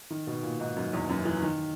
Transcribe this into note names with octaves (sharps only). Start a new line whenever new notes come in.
D#3
B2
A#2
G#2
F#2
E2
F#2
E3
D#3